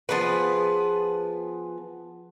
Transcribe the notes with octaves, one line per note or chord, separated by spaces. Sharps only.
F3 B3 G#4 B4